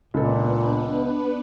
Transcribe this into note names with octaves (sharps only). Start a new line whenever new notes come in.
C#2 A#2 B3 D4 A4 B4